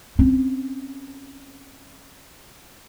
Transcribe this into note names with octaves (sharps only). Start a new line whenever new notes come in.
C4 C#4